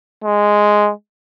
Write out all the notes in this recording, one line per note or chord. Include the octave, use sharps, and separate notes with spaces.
G#3